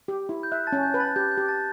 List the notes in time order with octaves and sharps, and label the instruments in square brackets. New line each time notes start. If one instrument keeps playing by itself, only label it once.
[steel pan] G4
E4
[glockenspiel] G6
[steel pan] E5 [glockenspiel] F#6
[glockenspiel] A5 A6
[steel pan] C#4
[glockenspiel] G6
[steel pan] B4
[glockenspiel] A5 A6
[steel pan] G4 [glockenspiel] G6
[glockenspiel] G6
[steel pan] G4
[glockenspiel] A5 A6